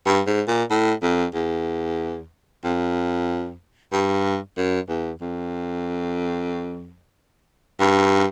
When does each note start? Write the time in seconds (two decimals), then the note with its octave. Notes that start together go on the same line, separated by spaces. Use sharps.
0.06 G2
0.27 G#2
0.48 A#2
0.71 A2
1.03 F2
1.34 E2
2.64 F2
3.93 G2
4.57 F#2
4.89 E2
5.21 F2
7.80 G2